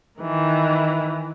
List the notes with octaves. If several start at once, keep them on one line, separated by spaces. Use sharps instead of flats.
D#3 E3